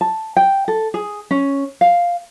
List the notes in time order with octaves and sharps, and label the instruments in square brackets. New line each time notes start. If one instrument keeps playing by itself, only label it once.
[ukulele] A5
G5
A4
G#4
C#4
F5